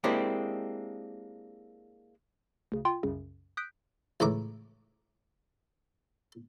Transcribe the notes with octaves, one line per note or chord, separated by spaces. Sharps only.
G#3 A#3 C4 D4 E4 G4
D2 C#3
F4 G5 C6
C2 F#2 C#3
D#6 F#6 G6 B6 D7
C#2 A2 E3 A#5 D6